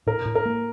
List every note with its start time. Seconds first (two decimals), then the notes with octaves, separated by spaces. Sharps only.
0.06 A2 A#4
0.25 A2
0.35 A#4
0.45 A#3